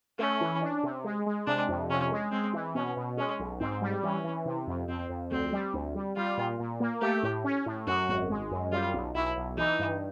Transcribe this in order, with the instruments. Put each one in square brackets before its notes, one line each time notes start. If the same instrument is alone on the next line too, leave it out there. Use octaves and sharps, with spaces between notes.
[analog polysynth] A3 [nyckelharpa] C#4
[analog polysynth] E3
D4
C3
G#3
G#3
[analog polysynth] C3 [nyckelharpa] D4
[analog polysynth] F2
[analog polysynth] C3 [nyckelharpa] C#4
[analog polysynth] G#3
[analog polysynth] G#3 [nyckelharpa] C4
[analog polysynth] E3
[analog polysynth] B2 [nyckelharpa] C#4
[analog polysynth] B2
[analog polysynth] G#3 [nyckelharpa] C#4
[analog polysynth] B1
[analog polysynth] G#2 [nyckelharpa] C4
[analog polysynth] G3
[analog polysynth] E3 [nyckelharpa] C#4
[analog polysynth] E3
C3
F2
[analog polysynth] F2 [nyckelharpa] C4
[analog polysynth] F2
[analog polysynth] D2 [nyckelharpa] C4
[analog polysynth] G3
D2
G3
[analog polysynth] G3 [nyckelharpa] F4
[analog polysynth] A#2
A#2
A#3
[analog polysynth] A3 [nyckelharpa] G4
[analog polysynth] A2
C#4
A2
[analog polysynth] F#2 [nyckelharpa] F#4
[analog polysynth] G#1
G#3
F#2
[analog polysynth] G3 [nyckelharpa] F4
[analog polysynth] B1
[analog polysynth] B1 [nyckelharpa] E4
[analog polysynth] B1
[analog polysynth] E3 [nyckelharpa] D#4
[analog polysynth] G2